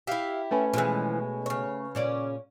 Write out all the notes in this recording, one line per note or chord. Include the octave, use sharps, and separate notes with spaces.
E4 G4 E5 F5
A3 C#4 B4 G#5 B5
B2 E3 F3 G#3
C#3 C#5
A#2 C#4 D5